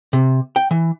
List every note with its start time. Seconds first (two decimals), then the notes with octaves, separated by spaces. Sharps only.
0.13 C3
0.56 G5
0.71 E3